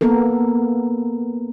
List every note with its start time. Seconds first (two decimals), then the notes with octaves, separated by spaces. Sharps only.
0.01 A#3 B3 A4 A#4